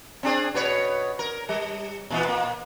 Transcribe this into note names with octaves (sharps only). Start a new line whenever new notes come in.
C4 D4 G#4
B2 B4 C#5
A#4
G3
A#2 E3 B3
A#2 A#3